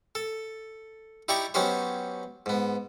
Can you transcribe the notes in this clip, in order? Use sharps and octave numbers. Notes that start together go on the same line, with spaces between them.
A4
D#4 E4 G4 D5 A#5 C#6
F#3 B3 C#4 D#4 G4 C5
G#2 B3